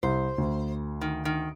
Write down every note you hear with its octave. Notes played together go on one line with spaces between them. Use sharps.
C2 C5
D2
D#3
D#3